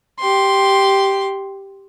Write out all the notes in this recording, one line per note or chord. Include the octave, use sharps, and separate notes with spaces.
G4 C6